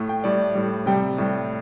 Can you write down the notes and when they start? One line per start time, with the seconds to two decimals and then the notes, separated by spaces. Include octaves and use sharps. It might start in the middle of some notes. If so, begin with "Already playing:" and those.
Already playing: A2 A3
0.09 G5
0.24 A2 G3 D5
0.55 A2 G3
0.86 C3 G3 G5
1.18 A2 G3